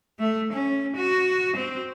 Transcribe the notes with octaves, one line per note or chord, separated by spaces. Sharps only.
A3
C#4
F#4
C4